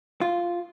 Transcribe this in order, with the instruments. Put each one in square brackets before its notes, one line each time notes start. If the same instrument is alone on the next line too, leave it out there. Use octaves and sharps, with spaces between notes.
[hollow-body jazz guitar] F4